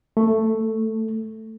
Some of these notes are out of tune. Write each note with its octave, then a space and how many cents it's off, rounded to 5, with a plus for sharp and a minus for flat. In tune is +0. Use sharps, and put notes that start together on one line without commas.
A3 +5